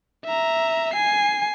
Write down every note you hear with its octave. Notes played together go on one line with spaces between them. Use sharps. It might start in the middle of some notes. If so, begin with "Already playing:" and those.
E5 A#5
G#5 C7